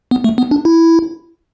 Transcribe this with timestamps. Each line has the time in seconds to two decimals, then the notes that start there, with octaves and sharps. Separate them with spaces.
0.11 B3
0.24 A3
0.38 B3
0.51 D4
0.65 E4